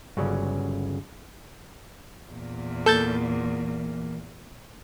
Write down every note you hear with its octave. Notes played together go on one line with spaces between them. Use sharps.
G1 C#3 F#3 C#4 D5
E2 A#2
E3 A#3 A4 G6 A6